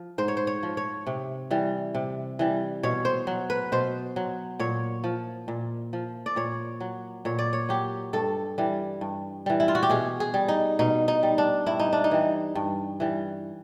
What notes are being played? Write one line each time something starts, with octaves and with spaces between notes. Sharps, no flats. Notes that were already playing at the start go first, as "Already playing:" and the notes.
Already playing: F3
G#2 C5
C#5
C5
C#5
F3
C#5
C3
E3 G3
C3
E3 G3
B2 C#5
C5
F#3
B4
B2 C5
F#3
A#2 C#5
F3
A#2
F3
D5
A#2 C#5
F#3
A#2 C#5
D5
C#5
F#3 G4
G2 A4
E3 G3
G2
E3 G3
E4
F4
F#4
G4
B2 G#4
G#4
G3
D#4
B2 D#4
D#4
G3
D4
G2 E4
D#4
D4
D#4
E3 G3
G2
E3 G3